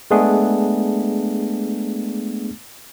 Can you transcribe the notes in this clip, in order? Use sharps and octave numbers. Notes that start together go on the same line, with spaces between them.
G#3 A3 B3 D4 G#4